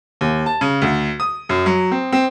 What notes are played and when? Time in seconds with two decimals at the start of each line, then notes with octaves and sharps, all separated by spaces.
0.21 D#2
0.46 A5
0.61 C#3
0.82 D2
1.20 D#6
1.49 F#2
1.66 F#3
1.91 C4
2.12 C4